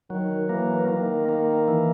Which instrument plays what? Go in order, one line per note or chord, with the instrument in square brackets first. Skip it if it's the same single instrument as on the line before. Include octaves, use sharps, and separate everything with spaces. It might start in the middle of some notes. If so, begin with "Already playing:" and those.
[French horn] D#3 [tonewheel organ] F#3
[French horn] E3 [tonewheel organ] A#3
[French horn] D#3 [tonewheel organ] A#3
[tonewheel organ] A#3
E3